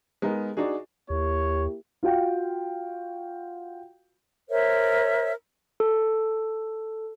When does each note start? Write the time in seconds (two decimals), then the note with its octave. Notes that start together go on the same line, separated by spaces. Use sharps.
0.22 G#3 B3 D#4 A#4
0.57 D4 D#4 F#4 G#4
1.10 D#2 A#3 E4 G4 C#5
2.03 F4 F#4 F5 G5
4.49 A#4 C5 C#5 E5
5.80 A4